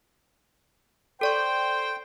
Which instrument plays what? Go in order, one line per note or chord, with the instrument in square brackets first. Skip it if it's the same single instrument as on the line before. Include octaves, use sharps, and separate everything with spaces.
[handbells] A4 D5 C#6 [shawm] C5 [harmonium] G5